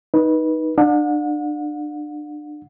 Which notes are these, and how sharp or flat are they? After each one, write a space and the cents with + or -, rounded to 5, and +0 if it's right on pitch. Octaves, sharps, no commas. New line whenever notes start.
D#4 +5 B4 -20
D4 +30 F#5 -40